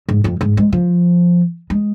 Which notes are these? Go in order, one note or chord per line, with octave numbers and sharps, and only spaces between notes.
G#2
F2
G#2
G#3
F3
G#3